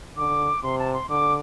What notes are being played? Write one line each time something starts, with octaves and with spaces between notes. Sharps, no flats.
D3 D6
C3 C6
A5
C6
D3 D6